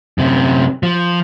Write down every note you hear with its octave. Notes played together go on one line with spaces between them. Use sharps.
F#2 C3
F3